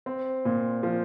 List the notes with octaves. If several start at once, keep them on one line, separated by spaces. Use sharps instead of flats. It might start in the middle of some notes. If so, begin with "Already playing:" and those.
C4
A#2
F3